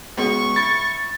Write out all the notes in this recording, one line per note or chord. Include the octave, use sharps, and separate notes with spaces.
C#2 B2 C#6
E4 A6